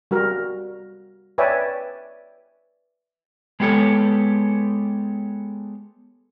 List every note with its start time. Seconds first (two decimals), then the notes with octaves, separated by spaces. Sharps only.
0.11 G3 F#4 A#4
1.38 B4 C#5 D5 E5 G5 G#5
3.60 G#3 B3 G4 A4 C#5